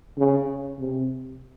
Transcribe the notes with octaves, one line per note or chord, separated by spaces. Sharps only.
C#3
C3